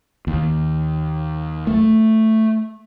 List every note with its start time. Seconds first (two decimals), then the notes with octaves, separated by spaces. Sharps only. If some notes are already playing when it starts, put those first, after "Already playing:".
0.27 D#2
1.67 A3